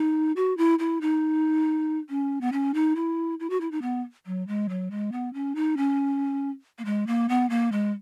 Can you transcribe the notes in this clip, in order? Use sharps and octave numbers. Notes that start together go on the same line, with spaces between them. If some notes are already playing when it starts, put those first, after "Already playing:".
Already playing: D#4
F#4
E4
E4
D#4
C#4
B3
C#4
D#4
E4
E4
F#4
E4
D#4
B3
F#3
G#3
F#3
G#3
B3
C#4
D#4
C#4
A#3
G#3
A#3
B3
A#3
G#3